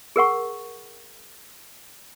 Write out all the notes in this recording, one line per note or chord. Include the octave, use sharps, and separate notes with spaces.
G#4 A#4 F#5 C#6